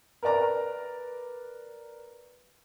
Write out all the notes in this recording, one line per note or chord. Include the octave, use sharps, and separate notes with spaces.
A#4 B4 D5 A#5